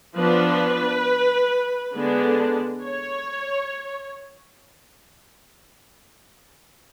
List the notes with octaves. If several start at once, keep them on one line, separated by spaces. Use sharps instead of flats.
F3 B3 D4 B4
D3 G#3 B3 D4
C#5